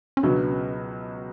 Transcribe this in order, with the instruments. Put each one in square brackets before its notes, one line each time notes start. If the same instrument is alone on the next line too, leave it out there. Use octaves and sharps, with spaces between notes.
[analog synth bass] C#4
[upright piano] C#2 B2 F#3 B3 [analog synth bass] D4
[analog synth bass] C#4